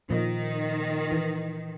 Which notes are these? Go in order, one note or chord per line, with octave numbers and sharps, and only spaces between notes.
A#2 D#3 F3
E3